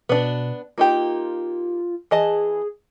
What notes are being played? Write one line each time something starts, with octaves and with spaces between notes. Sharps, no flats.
B2 B3 D4
A#3 D#4 F4 G4
E3 G#4 D#5 A5